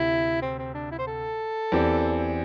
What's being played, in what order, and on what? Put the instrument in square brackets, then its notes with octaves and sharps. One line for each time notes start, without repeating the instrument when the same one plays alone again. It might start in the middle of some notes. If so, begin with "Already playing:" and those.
Already playing: [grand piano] D2 C3 [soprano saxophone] E4
[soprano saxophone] C4
C4
D4
E4
C5
A4
[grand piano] E2 E3 C4 G4 D5